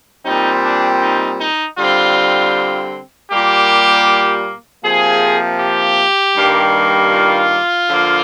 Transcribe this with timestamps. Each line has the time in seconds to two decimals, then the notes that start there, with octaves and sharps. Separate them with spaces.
0.25 A#2 G3 C4 D#4
0.63 D4
1.01 D#4
1.39 D#4
1.78 D3 G3 C4 F4
3.30 A#2 G3 A#3 G4
4.83 C3 F3 A#3 G#4
5.60 G4
6.37 G2 D#3 G3 A#3
7.12 F4
7.89 D3 F3 A#3